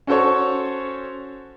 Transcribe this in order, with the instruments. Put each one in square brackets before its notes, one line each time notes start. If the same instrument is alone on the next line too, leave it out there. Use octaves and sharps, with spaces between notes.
[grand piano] C#4 F#4 A4 C5 C#5